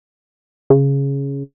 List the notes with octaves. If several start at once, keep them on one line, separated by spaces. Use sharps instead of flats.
C#3